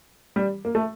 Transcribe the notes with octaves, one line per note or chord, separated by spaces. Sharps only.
G3
A#3
A3